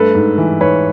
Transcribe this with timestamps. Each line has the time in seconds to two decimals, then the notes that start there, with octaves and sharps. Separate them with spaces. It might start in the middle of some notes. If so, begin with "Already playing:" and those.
Already playing: G2 A3 A4 B4
0.15 G#2
0.38 E3
0.61 G#2 B4 C#5